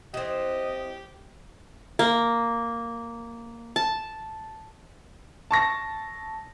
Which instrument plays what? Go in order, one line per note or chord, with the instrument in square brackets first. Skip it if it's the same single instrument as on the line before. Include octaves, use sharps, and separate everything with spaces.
[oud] E3 C4 [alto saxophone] G4 [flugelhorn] D#5
[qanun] A#3
A5
[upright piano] A5 C#6 A#6